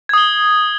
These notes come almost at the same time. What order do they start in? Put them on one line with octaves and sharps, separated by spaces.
G#6 D#6 G7